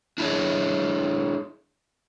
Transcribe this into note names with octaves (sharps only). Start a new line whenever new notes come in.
D4 E4 G#4 C#5